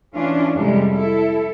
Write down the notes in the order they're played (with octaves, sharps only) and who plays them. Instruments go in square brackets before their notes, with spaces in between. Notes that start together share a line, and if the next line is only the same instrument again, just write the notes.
[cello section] E3 C#4 D4 F4
F2 C3 G3 G#3
E4 A4